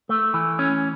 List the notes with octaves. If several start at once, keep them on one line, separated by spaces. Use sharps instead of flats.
A3
E3
C#4